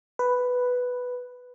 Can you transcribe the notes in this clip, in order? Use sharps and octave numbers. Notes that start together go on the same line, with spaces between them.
B4